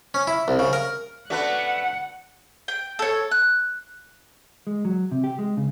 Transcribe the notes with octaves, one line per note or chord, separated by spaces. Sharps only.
C#4
E4
C2
C#3
A#4
A3 B3 C#4 D4 F#4 B4 F#5
G5
A4 C#5
F#6
G#3
F#3
C3
G4
G#3
C#3